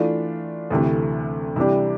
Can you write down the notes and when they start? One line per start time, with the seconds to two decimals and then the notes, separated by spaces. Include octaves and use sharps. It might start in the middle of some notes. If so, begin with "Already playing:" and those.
Already playing: E3 A3 D4 F4
0.71 D2 C3 E3 A3
1.56 C3 E3 G3 D4 G4